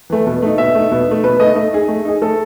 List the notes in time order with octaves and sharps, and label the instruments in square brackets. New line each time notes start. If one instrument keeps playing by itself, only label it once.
[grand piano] E3 A3
B2
A3 D#4
[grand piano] B2 [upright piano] E5
[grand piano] A3 D#4
B2
A3 D#4
[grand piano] B2 [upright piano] B4
[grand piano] A3 D#4 [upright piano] D#5
[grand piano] A3 [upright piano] D#5
[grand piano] D#4 G#4
A3
D#4 G#4
[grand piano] A3 [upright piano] A4